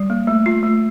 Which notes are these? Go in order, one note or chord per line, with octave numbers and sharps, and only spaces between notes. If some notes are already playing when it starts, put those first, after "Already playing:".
Already playing: G3
A#3
A3
F4
A3